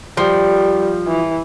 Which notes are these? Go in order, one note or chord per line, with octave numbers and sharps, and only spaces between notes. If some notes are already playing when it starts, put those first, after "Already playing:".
F3 G3
E3